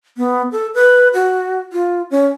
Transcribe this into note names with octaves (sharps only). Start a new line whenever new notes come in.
B3
A4
B4
F#4
F4
C#4